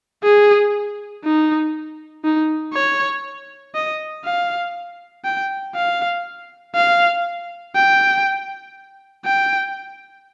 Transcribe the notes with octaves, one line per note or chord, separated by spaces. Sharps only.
G#4
D#4
D#4
C#5
D#5
F5
G5
F5
F5
G5
G5